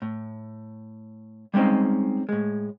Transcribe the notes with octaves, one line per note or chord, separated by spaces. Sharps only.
A2
G3 G#3 C4 C#4 D#4
A2 G#3